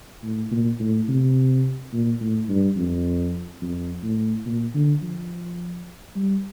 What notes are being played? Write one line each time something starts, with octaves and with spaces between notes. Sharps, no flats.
A2
A#2
A2
C3
A#2
A2
G2
F2
F2
A2
A#2
D3
F3
G3